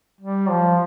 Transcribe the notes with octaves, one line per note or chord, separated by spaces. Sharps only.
G3
F3